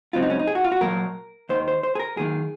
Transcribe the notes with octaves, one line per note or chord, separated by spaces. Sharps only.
C#2 C#3 F#3 C4 F4
D#4
C#4
D#4
G#4
F#4
F4
F#4
A#2 F#3 A#3 A#4
D#2 D#3 A#3 C5
C5
C5
G#4
A#4
F#2 D#3 A#3 G#4